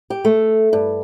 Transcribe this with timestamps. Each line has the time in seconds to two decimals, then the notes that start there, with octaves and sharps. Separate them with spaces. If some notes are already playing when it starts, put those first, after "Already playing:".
0.10 G4
0.25 A3
0.73 G2